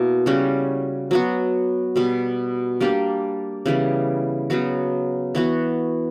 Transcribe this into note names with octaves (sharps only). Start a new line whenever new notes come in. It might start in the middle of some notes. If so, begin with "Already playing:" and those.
Already playing: B2 A#3 E4
C#3 G3 C#4 F#4
F#3 B3 F#4
B2 G3 B3
G3 A#3 D4 G4
C#3 E3 G3 B3
C#3 F#3 B3 F#4
E3 B3 F#4